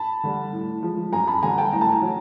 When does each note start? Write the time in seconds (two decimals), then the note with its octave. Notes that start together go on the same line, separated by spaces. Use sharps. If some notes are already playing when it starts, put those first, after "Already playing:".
Already playing: A5 B5
0.23 D3 G3
0.53 A2
0.83 F3 G#3
1.12 F#2 G#5 A#5
1.27 A5 B5
1.43 D3 G3 G#5 A#5
1.58 G5 A5
1.73 A2 A#5
1.81 A5
1.89 G#5 A#5
2.02 F#3